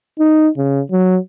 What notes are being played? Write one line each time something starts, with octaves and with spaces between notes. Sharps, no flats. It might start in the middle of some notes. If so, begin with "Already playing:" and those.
D#4
C#3
F#3